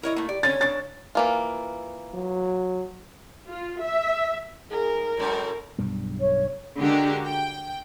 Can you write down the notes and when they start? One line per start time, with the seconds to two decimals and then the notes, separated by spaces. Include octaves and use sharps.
0.03 E4 A#4 C#5 D#5
0.16 A3 A#3
0.29 G4 D5
0.43 D3 C#4 C#5 A6
0.61 C#3 D4 A6
1.15 E3 A#3 F4
2.14 F#3
3.48 F4
3.81 E5
4.70 G#2 G#4 A#4
5.17 F#2 A2 E3 G#3
5.78 B1 G2 G3
6.19 C#5
6.79 D3 G#3 F#4 G4 A#4
7.26 G5